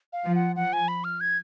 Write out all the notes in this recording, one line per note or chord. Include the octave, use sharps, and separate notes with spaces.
F5
F3
F#5
F3 F#5
G#5
B5
F6
G#6